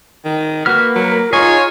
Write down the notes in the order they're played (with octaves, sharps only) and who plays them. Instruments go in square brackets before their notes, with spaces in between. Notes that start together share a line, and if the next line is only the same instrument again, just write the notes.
[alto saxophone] D#3
[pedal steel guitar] A#3 B4 F6 [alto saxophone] F#4
[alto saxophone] F#3 [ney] A#4
[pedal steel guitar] D#4 G#4 [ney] F4 [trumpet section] C#5 [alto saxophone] G#5